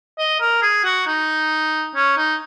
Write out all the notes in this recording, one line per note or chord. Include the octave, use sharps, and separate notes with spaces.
D#5
A#4
G#4
F#4
D#4
C#4
D#4